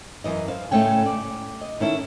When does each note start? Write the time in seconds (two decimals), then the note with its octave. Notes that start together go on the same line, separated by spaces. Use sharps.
0.24 F#2 D#3 E3 D#5
0.48 C5 F5
0.71 A2 C#3 A3 C#4 G5 G#5
1.06 D5
1.61 D#5
1.80 D#3 C#4 E4 A4